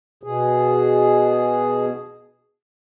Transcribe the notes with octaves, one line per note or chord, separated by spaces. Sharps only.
B2 G#4